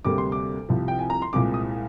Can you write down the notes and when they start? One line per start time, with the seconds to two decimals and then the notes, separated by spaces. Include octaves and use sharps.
0.05 D2 C3 G3 A#3 D6
0.18 C6
0.32 D6
0.69 C2 C3 F3
0.88 G5
0.99 G#5
1.10 A#5
1.22 C6
1.33 C2 A#2 G#3 C4 D6
1.54 D#6